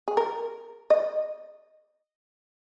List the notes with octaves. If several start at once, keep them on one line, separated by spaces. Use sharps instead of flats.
G#4
A#4
D#5